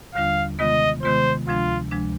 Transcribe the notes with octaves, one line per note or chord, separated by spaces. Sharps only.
D#2 D3 G3 D4 F4 F5
C3 D#3 G#3 B3 F4 D#5
C3 D#3 G#3 B3 F4 C5
D2 C3 F3 G#3 D4 F4
D2 C3 F3 G#3 D4